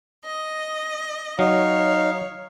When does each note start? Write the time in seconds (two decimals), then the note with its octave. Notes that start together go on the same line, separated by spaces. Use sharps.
0.24 D#5
1.39 F#3 D#4 C#5 F5